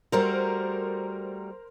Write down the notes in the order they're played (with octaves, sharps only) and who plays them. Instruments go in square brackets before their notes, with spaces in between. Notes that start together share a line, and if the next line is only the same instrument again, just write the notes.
[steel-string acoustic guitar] G3 A3 F#4 [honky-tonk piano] A#4 C5